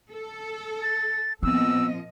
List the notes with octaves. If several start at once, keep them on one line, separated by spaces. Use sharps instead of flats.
A4
A6
A#2 F3 B3 C4 D#5 E6